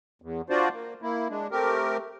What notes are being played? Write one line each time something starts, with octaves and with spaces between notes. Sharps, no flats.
E2
D4 F4 F#4 C5 D5
A#3
A#3 E4
G#3 D4
A3 C4 G4 A#4